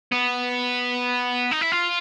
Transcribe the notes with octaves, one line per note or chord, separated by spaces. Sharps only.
B3
D#4
E4
F4